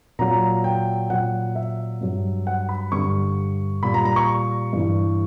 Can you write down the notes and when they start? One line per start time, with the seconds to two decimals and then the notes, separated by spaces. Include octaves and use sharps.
0.19 A#2 F#3 A#5
0.64 G5
1.10 A#2 F#3 F#5
1.55 E5
2.01 G2 F#3
2.47 F#5
2.69 B5
2.92 G2 D3 G3 C#6
3.83 A#2 G3 B5
3.94 A#5
4.05 A#5
4.16 C#6
4.73 G2 E3 G3